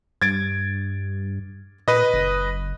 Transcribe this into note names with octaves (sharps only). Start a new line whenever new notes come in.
G2 G#6 A6 D7
A#2 B4 D#5
F#1